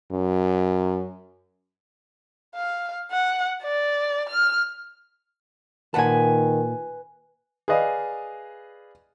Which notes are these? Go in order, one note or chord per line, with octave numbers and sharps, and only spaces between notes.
F#2
F5
F#5
D5
F6
A#2 D#3 B4 F#5 G#5 A5
G#4 B4 D5 D#5 F5